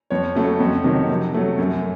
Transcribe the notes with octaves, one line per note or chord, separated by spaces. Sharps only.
F2 C#5
C#3 F#3 A3
F2
C3 D#3 F#3
C3
F#3 A3
F#2